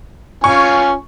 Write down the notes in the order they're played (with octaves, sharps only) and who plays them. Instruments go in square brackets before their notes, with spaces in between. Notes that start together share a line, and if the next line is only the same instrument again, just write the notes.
[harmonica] C#4 F4 G#5 [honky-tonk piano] C#6